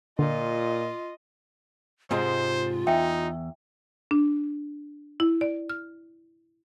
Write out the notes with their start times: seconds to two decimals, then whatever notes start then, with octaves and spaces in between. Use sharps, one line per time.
0.19 A#2 D3 F4 D#5
2.11 G#2 C3 G#3 F4 C5
2.87 E2 D#4 E5 G5
4.11 D4
5.20 E4
5.41 D5
5.70 F6